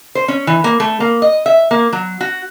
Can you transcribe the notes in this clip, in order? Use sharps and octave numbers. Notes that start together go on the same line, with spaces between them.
C5
C#4
E3
A#3
A3
A#3
D#5
E5
A#3
F#3
F#4